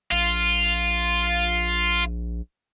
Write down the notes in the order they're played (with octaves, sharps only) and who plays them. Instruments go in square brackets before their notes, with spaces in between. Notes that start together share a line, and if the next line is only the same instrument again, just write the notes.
[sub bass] A#1 [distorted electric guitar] F4